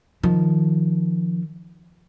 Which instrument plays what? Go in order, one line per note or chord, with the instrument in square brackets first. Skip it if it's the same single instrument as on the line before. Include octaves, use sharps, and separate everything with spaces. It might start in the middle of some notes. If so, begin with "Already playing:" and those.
[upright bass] D#3 F3